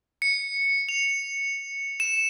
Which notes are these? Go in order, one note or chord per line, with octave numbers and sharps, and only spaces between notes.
C#7
F7
E7